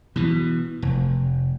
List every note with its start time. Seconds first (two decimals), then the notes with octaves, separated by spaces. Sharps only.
0.16 B2 E3
0.82 F1